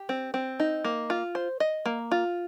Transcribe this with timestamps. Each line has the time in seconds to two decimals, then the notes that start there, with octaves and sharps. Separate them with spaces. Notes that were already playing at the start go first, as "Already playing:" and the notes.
Already playing: G4
0.09 C4
0.34 C4
0.60 D#4
0.84 A#3
1.10 F4
1.35 C5
1.60 D#5
1.86 A#3
2.11 F4